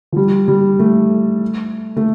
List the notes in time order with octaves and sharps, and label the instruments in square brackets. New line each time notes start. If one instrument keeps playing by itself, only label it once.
[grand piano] F3
G3
G3
A3
A3